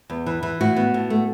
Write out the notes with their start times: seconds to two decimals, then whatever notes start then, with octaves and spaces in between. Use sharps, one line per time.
0.10 E2
0.26 E3
0.43 E3
0.61 A2 F#4
0.76 B3
0.94 A2
1.10 A3